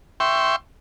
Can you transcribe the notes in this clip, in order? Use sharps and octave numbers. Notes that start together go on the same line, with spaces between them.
E5 G5 C6 C#6